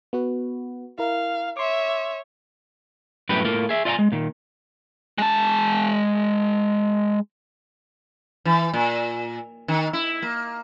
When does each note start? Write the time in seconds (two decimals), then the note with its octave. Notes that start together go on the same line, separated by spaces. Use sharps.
0.13 B3 F#4 B4
0.99 E4 A#4 F5
1.57 C#5 E5 C6 D6
3.29 F#2 A2 G3 G4 B4
3.45 A2 A#3 F4
3.69 G#4 E5
3.85 F4 D5 E5 F5 G#5 A#5
3.99 G#3
4.12 A#2 D#3
5.18 G#3 A5
8.45 E3
8.74 A#2
9.68 D#3
9.93 E4
10.22 A#3